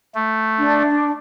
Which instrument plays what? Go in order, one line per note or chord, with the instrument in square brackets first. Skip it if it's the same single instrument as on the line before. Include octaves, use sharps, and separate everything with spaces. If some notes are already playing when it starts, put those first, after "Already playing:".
[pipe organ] A3
[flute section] D4